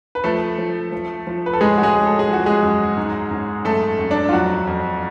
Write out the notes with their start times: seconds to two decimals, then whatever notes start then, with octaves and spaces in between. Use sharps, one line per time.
0.15 B4
0.24 F3 A3 A4
0.58 F3
0.92 F3
1.27 F3
1.46 B4
1.53 A4
1.61 A2 G#3 G#4
1.78 F#4
1.83 G#3 G#4
1.95 A2
2.06 A4
2.19 G#4
2.29 F3 F#4
2.46 G#3 G#4
2.63 F#2
2.97 G#2
3.31 G#2
3.65 F#2 A3 A4
3.99 F#2
4.11 D4 D5
4.29 F4
4.33 F2 F#3 F#4
4.67 F2